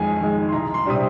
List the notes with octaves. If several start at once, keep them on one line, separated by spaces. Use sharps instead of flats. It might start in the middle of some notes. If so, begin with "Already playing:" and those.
Already playing: F2 D#3 G#3 G#5
D#3 G#3
C6
C2 A#5
C6
C3 G3 D4 D#6